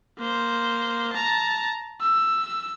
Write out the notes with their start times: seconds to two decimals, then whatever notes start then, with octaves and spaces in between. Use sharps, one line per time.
0.19 A#3 C5
1.13 A5 A#5
2.01 E6